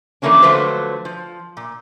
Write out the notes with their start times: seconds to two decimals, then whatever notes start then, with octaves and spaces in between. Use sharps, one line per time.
0.22 E3 F3 A3 A#3 C#4 D4
0.42 D3 F3 F#3 A3 B4 C5
1.05 F3
1.57 A#2